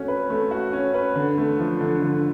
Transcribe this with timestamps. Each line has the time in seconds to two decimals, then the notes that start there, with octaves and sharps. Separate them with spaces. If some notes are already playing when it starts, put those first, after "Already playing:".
Already playing: A3 C#4 F#4
0.08 B4
0.30 A3
0.51 F#4
0.73 C#4
0.94 B4
1.16 D3
1.38 A3
1.59 F3
1.81 D3
2.02 D3